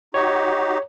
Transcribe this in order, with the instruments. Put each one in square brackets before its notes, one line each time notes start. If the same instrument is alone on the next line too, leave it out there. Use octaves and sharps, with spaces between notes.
[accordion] D#4 F#4 G4 [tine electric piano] C#5